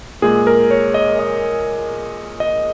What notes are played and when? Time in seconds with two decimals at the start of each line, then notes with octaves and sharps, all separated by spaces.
0.22 A#2 G#3 G#4
0.47 A#4
0.71 C#5
0.94 D#5
1.19 D#5
2.40 D#5